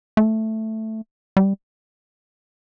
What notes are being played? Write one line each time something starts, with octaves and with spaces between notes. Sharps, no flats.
A3
G3